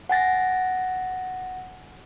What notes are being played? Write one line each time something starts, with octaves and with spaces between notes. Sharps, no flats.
F#5 G#5 A6 A#6